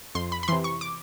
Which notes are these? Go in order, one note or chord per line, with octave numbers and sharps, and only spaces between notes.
F2 C6
B5
B5
C3 E3 C6
C#6
D6